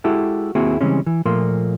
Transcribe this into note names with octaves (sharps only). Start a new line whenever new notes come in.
G#3 E4 F#4 G4 A4
D#2 A#3 C4 E4 F#4 G#4
C#3 E3 G3 G#3 C4 C#4
E3
A#2 F3 A3 A#3 F4 C6